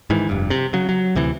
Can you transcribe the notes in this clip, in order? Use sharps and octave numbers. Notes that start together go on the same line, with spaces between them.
G#2 D#3 E3
F1 G2
C3
C#3 F#3
F#3
D2 C3 E3